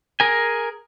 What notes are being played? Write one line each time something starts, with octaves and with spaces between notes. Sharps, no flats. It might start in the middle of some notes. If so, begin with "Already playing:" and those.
G#4 A#4 G#5